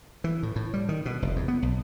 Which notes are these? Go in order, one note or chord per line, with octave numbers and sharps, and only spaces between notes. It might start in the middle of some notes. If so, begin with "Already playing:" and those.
E3
A2
A2
G3
D#3
B2
F1
E2
B3
B1